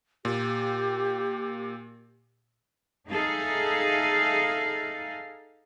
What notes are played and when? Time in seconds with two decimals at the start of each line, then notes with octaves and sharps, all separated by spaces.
0.25 A#2 G4
3.09 D#4 G#4 A4 E5 F5